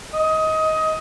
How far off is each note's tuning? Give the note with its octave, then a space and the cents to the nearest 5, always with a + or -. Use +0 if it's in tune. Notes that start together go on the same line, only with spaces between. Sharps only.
D#5 +20